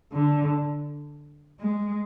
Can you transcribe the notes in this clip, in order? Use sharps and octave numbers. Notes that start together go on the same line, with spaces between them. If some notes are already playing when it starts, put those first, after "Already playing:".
D3
G#3